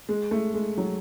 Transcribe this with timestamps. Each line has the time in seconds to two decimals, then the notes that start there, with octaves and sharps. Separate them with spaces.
0.09 G#3
0.31 A3
0.54 G#3
0.77 F#3